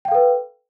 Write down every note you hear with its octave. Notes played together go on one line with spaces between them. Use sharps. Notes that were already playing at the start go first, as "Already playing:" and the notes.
A4 B4 F5 G5